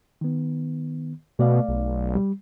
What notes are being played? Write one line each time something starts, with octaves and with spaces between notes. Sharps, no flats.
D#3 B3
B2 A3 D5 F5
B1
G3